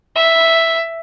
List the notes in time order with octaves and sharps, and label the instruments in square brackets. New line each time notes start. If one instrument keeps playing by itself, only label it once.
[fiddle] E5